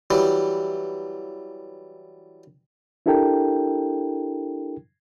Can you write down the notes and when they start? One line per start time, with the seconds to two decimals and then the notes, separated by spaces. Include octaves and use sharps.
0.11 E3 F#3 G3
3.06 D4 E4 G4 A4 A#4 G5